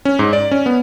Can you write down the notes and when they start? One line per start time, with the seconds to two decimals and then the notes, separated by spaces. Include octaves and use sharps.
0.05 C#4
0.19 G#2
0.33 D5
0.51 C#4
0.66 B3